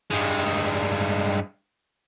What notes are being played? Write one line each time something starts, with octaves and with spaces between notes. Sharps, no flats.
G2 G#3